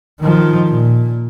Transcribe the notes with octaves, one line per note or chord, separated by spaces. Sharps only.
D#3 F3
A#2